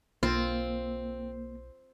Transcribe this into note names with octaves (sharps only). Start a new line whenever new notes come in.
B1 A#3 C4 F4